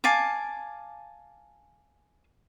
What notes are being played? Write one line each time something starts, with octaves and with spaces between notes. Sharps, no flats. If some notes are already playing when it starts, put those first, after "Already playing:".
F5 G#5 A5 D6